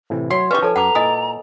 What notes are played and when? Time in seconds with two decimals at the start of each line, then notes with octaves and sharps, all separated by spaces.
0.10 A2 C3 E3
0.30 F#3 E4 C#5 C6
0.51 C#4 D#4 G4 B4 D5 F5 C#6
0.62 F3 A4 C#5 G#5 A5
0.76 F#2 B4 F#5 A#5 D6
0.95 A#2 E4 D#5 G#5 D#6